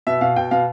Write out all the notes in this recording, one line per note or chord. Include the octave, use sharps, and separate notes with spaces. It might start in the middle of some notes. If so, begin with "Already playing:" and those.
B2 E5
B2 F5
B2 G5
B2 F5